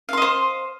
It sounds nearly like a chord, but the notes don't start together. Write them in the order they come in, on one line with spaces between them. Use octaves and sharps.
F5 C6 D#5 C5